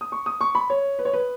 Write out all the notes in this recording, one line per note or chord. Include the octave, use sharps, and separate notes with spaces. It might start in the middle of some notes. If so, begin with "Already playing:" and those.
D#6
C#6
D#6
C#6
B5
C#5
B4
C#5
B4